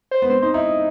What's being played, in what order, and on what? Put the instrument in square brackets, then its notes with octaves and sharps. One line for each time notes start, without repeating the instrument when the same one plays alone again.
[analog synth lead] C5
[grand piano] B3
[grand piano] C4 [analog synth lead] C5
[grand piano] D#4 [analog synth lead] C5
[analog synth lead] D#4 [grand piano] E4